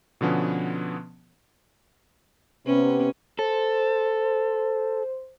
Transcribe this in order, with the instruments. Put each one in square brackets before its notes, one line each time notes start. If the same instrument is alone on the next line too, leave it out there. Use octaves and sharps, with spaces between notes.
[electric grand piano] B2 D3 F3 B3 C#4
[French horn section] C3 B3 B4 [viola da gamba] C#4
[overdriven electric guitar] A4 [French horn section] C5